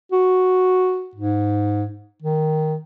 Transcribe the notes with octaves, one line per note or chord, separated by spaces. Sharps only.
F#4
G#2
D#3